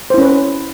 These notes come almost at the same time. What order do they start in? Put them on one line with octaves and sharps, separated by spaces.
C5 E4 C#4 B4